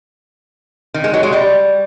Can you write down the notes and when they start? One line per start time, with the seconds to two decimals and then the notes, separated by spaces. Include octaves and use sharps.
0.94 D#3
1.04 G#3
1.13 F#3
1.23 G#3
1.32 G3